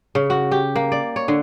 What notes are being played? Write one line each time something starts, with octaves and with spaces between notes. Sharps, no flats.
C#3
F#4
G4
A#3
D5
C#5
D3